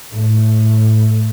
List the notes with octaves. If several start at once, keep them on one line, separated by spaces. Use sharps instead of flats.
A2